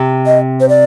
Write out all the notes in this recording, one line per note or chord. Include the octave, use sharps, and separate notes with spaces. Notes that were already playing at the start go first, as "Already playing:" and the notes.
Already playing: C3
D#5
C5
D5